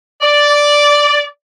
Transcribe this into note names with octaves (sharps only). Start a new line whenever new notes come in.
D5